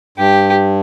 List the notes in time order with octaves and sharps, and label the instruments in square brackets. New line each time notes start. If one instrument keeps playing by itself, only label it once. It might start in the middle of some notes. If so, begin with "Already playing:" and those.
[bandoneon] G2 [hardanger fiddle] G4